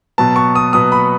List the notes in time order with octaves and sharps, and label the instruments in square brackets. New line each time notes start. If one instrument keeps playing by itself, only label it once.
[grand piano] B2 F#3 B3 A5
C#6
D#6
B2 F#3 B3 D#6
B5